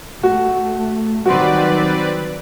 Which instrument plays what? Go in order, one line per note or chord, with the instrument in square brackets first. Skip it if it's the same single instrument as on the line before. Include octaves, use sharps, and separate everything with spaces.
[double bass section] A3 [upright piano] F#4
[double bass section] D#3 F#3 G3 [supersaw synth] C4 B4 D5 [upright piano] F#4 C6